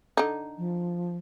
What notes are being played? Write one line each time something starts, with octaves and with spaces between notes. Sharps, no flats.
D3 D#4
F3